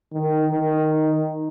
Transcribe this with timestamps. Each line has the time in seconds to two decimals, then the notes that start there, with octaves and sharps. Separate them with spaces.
0.13 D#3
0.52 D#3